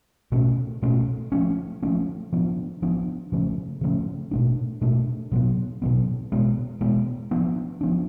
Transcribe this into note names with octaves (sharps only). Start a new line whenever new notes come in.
B2 A3 C#4
B2 A3 C#4
F3 A3 C#4
F3 A3 C#4
F3 B3 D4
F3 B3 D4
C#3 F3 A3 C#4
C#3 F3 A3 C#4
B2 A3 D4
B2 A3 D4
B2 F#3 B3
B2 F#3 B3
B2 G#3 B3
B2 G#3 B3
F3 B3 D4
F3 B3 D4